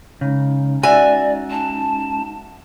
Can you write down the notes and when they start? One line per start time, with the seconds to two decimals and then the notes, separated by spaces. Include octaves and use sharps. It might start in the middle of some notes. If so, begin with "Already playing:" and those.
0.21 C#3 G#3 C#4 D#4
0.83 F#4 D5 E5 G#5
1.50 A5